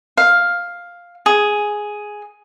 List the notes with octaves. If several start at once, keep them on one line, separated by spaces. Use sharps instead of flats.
F5
G#4